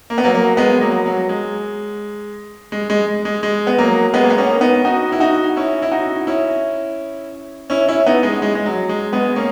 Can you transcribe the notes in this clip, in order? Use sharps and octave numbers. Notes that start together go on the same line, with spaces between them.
A#3
B3
F#3 A#3
F#3 A#3
G#3 B3
F#3 A#3
F#3
G#3
G#3
G#3
G#3
G#3
B3
F#3 A#3
G#3 B3
A#3
B3
A#3 C#4
B3 D#4
D#4 F#4
E4
D#4 F#4
C#4 E4
E4
D#4 F#4
C#4 E4
C#4 E4
C#4 E4
B3 D#4
G#3
G#3
G#3
F#3
G#3
G#3 B3
A#3 C#4